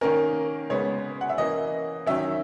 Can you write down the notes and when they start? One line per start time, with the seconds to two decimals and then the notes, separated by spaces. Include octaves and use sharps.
0.01 D#3 A#3 C#4 A#4
0.70 C#3 G#3 B3 C#5
1.21 F#5
1.29 E5
1.38 E3 A#3 C#4 D#5
2.07 D#3 F#3 C#4 E5